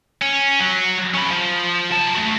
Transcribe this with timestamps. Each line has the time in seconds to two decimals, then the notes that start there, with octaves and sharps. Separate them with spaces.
0.22 C#4
0.60 F#3
1.14 C#4 B5
1.30 F3
1.92 F#3 A5
2.15 A3 F#4